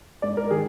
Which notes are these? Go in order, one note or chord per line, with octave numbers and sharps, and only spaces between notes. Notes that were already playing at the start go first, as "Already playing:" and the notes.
G#2 D5
A#4
D#3 G#4